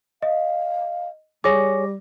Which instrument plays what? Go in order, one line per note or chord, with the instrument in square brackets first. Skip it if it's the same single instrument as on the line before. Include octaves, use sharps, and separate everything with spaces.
[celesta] D#5 [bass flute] F5
[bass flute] G3 [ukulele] G#4 C#5 [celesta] D6 A#6